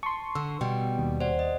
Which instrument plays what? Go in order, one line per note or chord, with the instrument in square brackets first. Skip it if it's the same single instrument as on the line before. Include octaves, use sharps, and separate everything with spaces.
[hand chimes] A5 [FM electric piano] C6 C#6
[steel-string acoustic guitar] D3 [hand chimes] E6
[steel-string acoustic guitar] B2 G3 [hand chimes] G5
[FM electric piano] D#2
[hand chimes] C5 D5 F#5
D#5